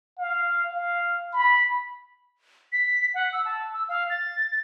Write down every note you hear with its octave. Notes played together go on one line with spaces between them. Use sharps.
F5
F5
B5
B6
F#5
E6
A5
E6
F5
A6